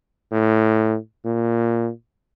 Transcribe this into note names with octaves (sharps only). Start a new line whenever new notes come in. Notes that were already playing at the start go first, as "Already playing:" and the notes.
A2
A#2